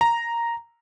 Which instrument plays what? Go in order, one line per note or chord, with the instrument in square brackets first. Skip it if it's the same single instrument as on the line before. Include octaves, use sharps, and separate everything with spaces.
[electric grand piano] A#5